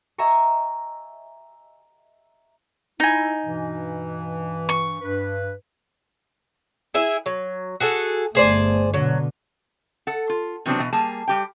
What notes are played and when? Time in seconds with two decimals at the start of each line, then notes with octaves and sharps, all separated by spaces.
0.18 D#5 E5 G#5 A#5 C#6
3.00 D#4 E4 G#5
3.43 G2 B2 E3
4.69 C#6
5.02 G2 B4
6.94 E4 G#4 E5
7.26 F#3
7.80 F#4 G#4 A4
8.35 G1 A3 G#4 C5 D5
8.94 B2 D3 F#3
10.07 A4 F#5
10.29 F4
10.66 C3 E3 F#3 B3 C4 D4
10.80 B2 E3
10.93 G3 A#3 G#4 A5
11.28 G3 G4 G5